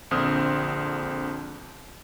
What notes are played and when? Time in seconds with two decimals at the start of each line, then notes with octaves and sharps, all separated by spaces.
0.11 A#1 D3 C4 D#6 F6